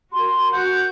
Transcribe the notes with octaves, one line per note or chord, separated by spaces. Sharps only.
F#4 A#4 C6
F#4 F#5 G6